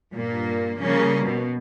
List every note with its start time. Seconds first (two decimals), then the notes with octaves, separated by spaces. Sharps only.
0.15 G2 A#2 A#3
0.79 C#3 F3 G3 A#3 C#4
1.22 B2